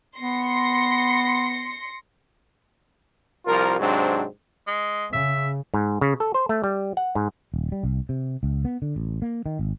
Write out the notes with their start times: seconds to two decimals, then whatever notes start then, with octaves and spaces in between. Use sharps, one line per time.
0.19 B3 C6 A#6 C#7
3.46 C2 F3 F4 A#4
3.79 G#2 C3 F#3 C4 D4
4.67 G#3
5.13 C#3 E5
5.74 G#2
6.01 C#3
6.20 A4
6.34 C5
6.49 A3
6.64 G3
6.97 F#5
7.15 G#2
7.54 D#1
7.72 G3
7.83 C2
8.09 C3
8.43 C#2
8.65 B3
8.82 D3
8.96 A1
9.22 A#3
9.46 D#3
9.59 G#1